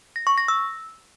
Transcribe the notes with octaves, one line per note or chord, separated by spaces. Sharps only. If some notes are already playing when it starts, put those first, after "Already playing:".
A#6
C#6
A#6
E6